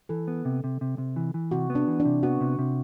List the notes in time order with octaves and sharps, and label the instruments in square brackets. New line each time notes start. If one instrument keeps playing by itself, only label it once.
[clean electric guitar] E3 [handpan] A4
[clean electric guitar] B3
C3
C3
C3
C3
E3
E3
[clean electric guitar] C3 [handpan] F#4
[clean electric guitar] B3
[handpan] D4
[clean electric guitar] E3
[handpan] D4
[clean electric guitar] C3
[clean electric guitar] B3 [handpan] F#4
[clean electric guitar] C3
C3